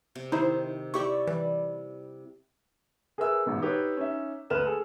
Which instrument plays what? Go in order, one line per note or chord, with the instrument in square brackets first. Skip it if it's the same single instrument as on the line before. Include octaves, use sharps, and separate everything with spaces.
[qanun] C3
[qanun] D#3 [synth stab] D#4 E4 C5
[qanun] E4 D5 E5 [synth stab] G4 C#6
[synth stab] E3 [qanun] G3
[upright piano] G#4 A#4 B4 E5 E6
A1 G#2 B2
D#4 G4 B4 C#5
C#4 D#4 E5
D2 B4 F6 E7
G#4 A4